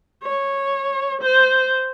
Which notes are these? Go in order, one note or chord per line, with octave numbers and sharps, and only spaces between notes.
C#5
C5